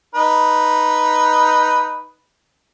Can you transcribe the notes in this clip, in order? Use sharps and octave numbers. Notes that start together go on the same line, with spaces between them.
D#4 B4